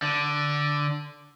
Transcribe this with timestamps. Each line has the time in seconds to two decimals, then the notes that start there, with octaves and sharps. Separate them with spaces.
0.02 D3